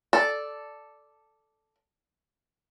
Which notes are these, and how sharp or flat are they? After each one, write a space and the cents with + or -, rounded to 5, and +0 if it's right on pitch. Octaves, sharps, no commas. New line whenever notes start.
A4 +0 D5 +0